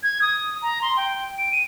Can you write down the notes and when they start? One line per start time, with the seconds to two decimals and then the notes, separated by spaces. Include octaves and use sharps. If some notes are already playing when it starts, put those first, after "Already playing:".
0.03 G#6
0.22 D#6
0.62 A#5
0.82 C6
0.97 G5
1.38 D7
1.52 D#7